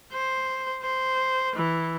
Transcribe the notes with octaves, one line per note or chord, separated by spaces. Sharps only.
C5
C5
E3